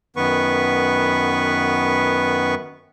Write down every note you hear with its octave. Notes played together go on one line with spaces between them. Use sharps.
F#2 D#3 B3 B4 C#6